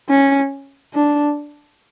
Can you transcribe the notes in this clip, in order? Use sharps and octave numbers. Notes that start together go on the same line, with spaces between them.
C#4
D4